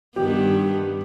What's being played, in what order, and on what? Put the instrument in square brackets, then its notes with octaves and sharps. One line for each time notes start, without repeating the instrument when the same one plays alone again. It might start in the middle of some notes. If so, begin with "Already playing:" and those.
[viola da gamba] G2 D#3 B3 [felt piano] G4